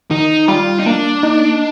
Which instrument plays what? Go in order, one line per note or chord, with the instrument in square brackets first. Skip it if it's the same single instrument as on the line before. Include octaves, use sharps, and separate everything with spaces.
[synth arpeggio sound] D#3 [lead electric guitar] D#4
[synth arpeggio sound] G3 [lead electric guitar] F4
[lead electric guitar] D#4
[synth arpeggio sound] A#3 [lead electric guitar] D4
[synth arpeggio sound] D#4